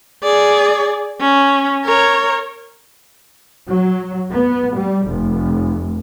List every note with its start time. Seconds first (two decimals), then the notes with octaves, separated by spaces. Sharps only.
0.24 G#4 D5
1.21 C#4
1.85 A#4 C#5
3.68 F#3
4.31 B3
4.75 G3
5.08 F1